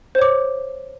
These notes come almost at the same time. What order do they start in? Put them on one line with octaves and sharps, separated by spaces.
C5 C#5 D6